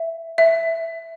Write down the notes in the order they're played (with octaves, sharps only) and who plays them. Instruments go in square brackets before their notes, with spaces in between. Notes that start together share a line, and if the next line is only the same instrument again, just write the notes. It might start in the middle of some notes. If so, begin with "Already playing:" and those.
Already playing: [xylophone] E5
E5